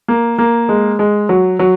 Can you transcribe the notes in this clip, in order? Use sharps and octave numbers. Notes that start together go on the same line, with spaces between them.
A#3
A#3
G#3
G#3
F#3
F#3